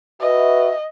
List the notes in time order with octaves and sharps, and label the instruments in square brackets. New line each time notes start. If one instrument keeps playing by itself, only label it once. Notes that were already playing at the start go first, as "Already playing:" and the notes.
[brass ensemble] F#4 B4 E5 [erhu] D#5